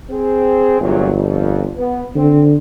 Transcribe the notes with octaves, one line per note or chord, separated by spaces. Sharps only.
C4 G#4
G1 E2 A#2 F#3
F2
B3
D3 C4